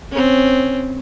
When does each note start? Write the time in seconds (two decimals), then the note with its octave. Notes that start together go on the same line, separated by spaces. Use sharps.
0.11 C4 C#4